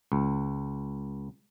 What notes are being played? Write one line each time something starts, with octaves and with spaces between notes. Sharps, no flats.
C#2